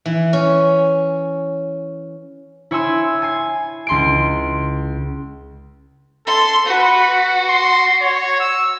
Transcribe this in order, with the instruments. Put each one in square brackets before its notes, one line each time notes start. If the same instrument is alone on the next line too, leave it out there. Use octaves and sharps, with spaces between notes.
[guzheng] E3
C#4
[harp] E4 C#5 G#5 C6 E6
G#5 G#6 C7
C#2 C6 D7
[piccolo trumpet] A4 [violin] C6
[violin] F#4 [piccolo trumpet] B4
[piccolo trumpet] C6
C#5
E6